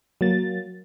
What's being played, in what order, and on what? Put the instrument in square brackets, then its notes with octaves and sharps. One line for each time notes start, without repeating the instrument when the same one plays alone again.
[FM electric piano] F#3 A#3 A6